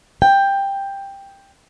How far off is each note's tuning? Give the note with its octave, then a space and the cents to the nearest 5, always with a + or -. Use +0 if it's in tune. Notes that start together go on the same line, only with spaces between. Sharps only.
G5 +10